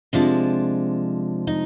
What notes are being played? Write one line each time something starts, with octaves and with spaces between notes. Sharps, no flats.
C3 F3 G#3 D4
D#4